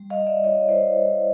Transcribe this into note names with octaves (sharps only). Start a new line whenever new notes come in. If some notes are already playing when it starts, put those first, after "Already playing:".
Already playing: G3
D#5 F5
G3
D5 E5
E4 C#5 D#5
E4 C5 D5